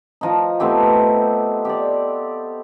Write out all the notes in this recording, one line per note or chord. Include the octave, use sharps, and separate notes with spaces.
F3 D#4
A3 B3 C4 G4
G4 D5